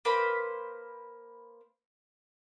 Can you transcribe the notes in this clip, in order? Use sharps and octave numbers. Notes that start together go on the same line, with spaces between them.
A#3 B4 C5 B5